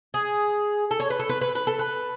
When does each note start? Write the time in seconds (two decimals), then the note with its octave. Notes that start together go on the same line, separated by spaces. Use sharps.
0.14 G#4
0.91 A4
1.00 C#5
1.10 B4
1.19 A4
1.29 B4
1.41 B4
1.55 B4
1.67 A4
1.79 B4